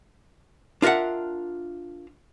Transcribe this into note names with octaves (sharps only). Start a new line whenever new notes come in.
D4 F4 A#4 E5 F#5